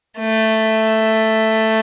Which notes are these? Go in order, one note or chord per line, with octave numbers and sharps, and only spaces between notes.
A3